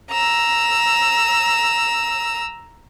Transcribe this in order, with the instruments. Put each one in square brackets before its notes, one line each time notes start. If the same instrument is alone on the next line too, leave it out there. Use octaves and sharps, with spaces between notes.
[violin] A#5 E6